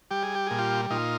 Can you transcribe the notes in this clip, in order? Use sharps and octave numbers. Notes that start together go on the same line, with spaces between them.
G3 G4
G#4
G4
A#2 G#4
F4 G4
A#2 D#4 F4